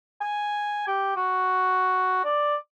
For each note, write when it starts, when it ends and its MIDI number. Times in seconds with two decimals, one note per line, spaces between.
0.21 0.85 80
0.87 1.13 67
1.16 2.21 66
2.25 2.56 74